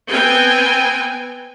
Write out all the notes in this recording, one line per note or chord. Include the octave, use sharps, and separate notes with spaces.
B3 C4 G5 G#5